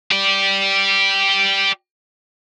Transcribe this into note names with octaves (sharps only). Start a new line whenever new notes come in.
G4 D5